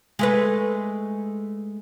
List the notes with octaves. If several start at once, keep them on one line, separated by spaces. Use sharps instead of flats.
G#3 A3 B4